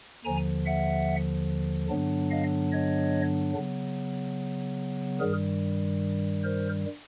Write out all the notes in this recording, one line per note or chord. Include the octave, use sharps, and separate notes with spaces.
D#2 D3 F3 G#5 A#5
E5 F#5
G2 D3 F#3 B3 D4
D#5 F5
C#5 D#5
C#3 F#3 B3
G2 D#3 G3 G#4 A#4
A#4 C5